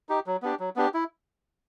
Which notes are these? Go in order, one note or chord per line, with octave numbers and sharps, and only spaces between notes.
D#4 G4
F#3
B3 D4 G4
F#3
B3 D4 G4
E4